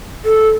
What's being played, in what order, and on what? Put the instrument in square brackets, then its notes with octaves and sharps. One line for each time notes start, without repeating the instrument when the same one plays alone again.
[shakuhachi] A4